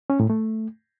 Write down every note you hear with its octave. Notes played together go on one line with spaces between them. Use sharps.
C#4
A2
A3